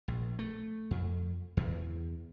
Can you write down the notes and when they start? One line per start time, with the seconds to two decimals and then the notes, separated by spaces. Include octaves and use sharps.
0.08 A#1
0.39 A3
0.91 F2
1.57 E2